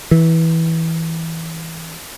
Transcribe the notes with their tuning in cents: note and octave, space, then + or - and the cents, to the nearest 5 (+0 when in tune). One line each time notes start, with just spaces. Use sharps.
E3 -15